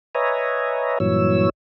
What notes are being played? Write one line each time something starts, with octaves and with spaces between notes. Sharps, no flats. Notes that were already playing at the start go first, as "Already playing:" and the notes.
B4 C#5 D#5 E5 G#5 A#5
G2 A#2 E3 F#3 C#5 E6